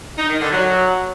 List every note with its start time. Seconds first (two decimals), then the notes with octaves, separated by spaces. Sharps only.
0.17 D#4
0.29 D#3
0.40 D3
0.51 F#3